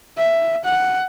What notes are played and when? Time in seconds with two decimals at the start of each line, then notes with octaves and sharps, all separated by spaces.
0.17 E5
0.65 F#5